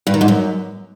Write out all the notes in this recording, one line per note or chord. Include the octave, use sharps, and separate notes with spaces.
G2
D#3
G#2
F#2